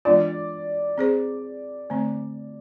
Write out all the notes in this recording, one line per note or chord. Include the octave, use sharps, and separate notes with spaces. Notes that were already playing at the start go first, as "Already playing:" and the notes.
E3 G#3 B3 D4 F4 D5
C4 G#4 C5
D3 A3 C4